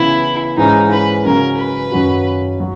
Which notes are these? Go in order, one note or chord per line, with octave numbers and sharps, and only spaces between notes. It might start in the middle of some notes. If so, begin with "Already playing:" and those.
Already playing: C#3 E3 B3 E4
G#2 E3 G#3 C#4 D#4
B4
C#3 F#3 C#4 A#4
B4
F#2 D#3 F#3 C#4 F#4
F#3